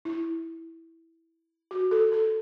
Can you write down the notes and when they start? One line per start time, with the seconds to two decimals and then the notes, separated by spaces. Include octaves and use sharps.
0.05 E4
1.71 F#4
1.91 A4
2.12 A4